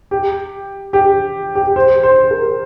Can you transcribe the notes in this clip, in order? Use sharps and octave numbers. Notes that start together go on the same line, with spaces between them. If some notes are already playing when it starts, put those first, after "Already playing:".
G4
G4
G4
C5
C5
A#4